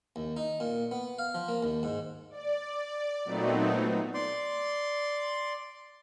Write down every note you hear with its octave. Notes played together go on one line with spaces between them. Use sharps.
D#2
D#4
A#2
B3
F5
F3
A#3
D#2
G#2
D5
A#2 F#3 A3 B3 C4 D#4
D5 C6